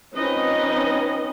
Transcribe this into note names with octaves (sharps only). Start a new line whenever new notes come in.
F3 C4 C#4 D#4 B4 D#5